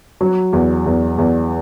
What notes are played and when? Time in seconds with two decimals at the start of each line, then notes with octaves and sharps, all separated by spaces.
0.21 F#3
0.53 E2
0.86 E2
1.18 E2